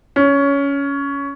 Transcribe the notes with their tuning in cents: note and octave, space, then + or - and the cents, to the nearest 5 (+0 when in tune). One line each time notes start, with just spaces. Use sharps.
C#4 +15